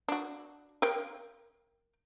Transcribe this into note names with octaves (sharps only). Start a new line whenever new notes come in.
D4 F#4
A#4 F5 G5